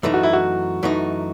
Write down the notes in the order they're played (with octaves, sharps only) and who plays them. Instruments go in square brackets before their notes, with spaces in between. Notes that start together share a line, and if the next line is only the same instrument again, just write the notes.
[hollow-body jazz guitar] F#2 E3 A3 D#4
[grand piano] F#4
E4
F#4
[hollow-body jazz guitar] F#2 E3 A3 D#4